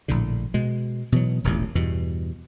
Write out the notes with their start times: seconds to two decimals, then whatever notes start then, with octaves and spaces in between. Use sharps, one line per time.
0.08 A#1 A2 D3
0.54 B2 G#3
1.12 B2 E3 F#3
1.44 E1 A1 D#2 A#2
1.75 E2 G2 B2